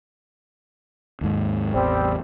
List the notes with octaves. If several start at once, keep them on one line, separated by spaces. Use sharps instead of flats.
D#2 G#2
A1 E2 G3 C4